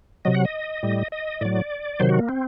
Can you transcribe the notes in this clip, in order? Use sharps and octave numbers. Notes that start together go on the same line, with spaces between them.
C3 F#3 D#5
F#5
D#5
A2 G3
D#5
A2 F#3 D5
C3 D#3 F#3 C5
F#4
A#3
C4